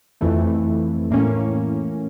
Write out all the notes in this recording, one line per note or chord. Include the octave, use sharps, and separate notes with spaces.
F2 E3 A3
A2 E3 A#3 C#4